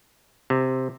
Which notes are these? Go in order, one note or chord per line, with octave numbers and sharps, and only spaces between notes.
C3